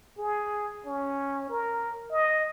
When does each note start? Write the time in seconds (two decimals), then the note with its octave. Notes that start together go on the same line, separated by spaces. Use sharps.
0.18 G#4
0.86 C#4
1.49 A#4
2.11 D#5